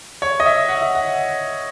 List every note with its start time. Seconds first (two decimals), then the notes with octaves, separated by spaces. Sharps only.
0.22 C#5
0.40 D#5
0.46 E5
0.69 F#5
0.81 E5
0.95 F#5